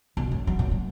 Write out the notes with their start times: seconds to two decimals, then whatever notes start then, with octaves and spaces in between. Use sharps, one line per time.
0.17 B1
0.32 F#2
0.47 F#3
0.59 A#2
0.71 F#3